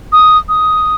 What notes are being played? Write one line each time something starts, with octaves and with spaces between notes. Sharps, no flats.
D#6
D#6